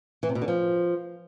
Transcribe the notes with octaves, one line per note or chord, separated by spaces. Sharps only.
E3
C3
B2
D3
F3